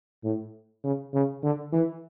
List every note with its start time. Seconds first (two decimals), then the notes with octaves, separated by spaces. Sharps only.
0.24 A2
0.84 C#3
1.13 C#3
1.43 D3
1.73 E3